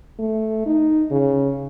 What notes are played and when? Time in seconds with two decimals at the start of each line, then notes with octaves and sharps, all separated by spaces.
0.19 A3
0.66 D#4
1.11 C#3